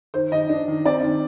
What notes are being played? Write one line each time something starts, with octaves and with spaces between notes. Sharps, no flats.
D#3 C5
D#3 D#5
D4
D#3
C4 D5
D#3